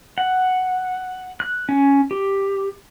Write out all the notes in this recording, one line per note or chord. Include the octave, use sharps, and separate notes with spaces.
F#5
F#6
C#4
G4